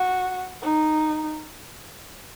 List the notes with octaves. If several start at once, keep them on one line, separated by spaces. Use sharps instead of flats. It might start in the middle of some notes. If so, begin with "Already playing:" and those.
Already playing: F#4
D#4